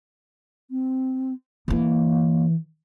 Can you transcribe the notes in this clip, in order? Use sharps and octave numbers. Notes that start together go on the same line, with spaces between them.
C4
D3 E3 A#3